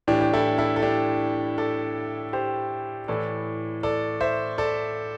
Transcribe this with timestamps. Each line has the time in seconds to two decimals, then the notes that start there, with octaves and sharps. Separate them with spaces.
0.07 A2 E3 D4 G4
0.21 G4
0.33 E4 A4
0.58 E4 A4
0.76 A4
0.82 D4 G4
1.58 A4 D5
2.33 G4 C5
3.08 A2 E3 A4 D5
3.83 A4 D5
4.21 C5 E5
4.58 A4 D5